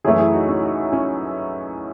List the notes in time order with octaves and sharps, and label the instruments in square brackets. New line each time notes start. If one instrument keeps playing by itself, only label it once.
[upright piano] F#2 E3 A3 [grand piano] E4 G#4
[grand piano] E4 G#4
D#4 F#4
C#4 E4
D#4 F#4
C#4 E4